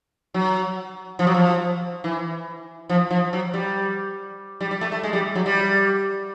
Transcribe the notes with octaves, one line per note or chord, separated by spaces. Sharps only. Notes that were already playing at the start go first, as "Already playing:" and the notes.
F#3
F3
F#3
F3
E3
F3
F3
F#3
G3
G3
G3
A3
A3
G#3
G3
F#3
G3